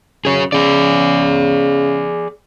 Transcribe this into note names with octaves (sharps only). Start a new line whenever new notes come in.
F#2 G#4 C#5
C#3 G#4 D5